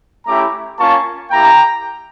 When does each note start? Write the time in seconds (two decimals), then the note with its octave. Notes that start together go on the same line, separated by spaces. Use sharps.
0.26 A3 C#4 E4 G4 A#5 D6
0.79 A#3 C#4 F4 A5 C#6
1.31 A#3 E4 G4 G5 A#5